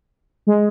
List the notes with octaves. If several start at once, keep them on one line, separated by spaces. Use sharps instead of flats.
G#3